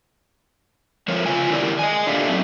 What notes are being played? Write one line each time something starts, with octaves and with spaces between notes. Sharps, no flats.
F3 A3 A#4 C5 C#5
C#3 F4 F5 G#5
D#3 E4 G4 A#4 C#5 D5
D#5 G#5
A#2 D4 G4 A4 E5 F5
F#3 A3 C4 D#4